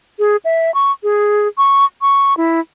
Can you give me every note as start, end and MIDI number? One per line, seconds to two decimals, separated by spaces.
0.19 0.37 68
0.45 0.73 76
0.74 0.92 85
1.03 1.48 68
1.58 1.85 85
2.01 2.36 85
2.37 2.60 64